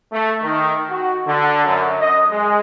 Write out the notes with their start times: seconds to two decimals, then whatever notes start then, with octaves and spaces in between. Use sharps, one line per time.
0.12 A3
0.42 D#3
0.90 F#4
1.27 D3
1.65 F#2
2.00 D#5
2.31 G#3